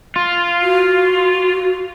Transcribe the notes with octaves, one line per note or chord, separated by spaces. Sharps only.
F4
F#4